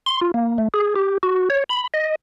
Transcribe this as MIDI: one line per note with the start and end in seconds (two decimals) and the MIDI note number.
0.06 0.20 84
0.21 0.31 65
0.34 0.58 58
0.58 0.68 57
0.74 0.94 68
0.96 1.18 67
1.23 1.49 66
1.50 1.64 73
1.69 1.87 83
1.94 2.15 75